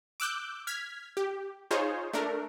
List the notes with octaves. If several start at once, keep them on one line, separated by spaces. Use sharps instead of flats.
D6 E6 F#6 G6
F6 G#6 B6
G4
D#4 F4 G#4 C5 C#5
A3 D4 A#4